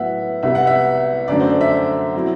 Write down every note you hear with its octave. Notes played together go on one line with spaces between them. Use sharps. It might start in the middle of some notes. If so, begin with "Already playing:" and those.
Already playing: A2 F#3 B3 E5 F#5
C2 C3 G3 B3 E5
F#5
E5
F#2 D3 F#3 A3 D5
C5
D5
E5
E5
B2 F#3 C4 E4